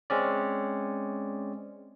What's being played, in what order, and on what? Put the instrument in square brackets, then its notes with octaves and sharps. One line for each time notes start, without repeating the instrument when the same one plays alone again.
[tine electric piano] G#3 C4 C#4 D5